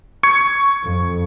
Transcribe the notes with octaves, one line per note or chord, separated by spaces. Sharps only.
C#6 G#6 C#7
F2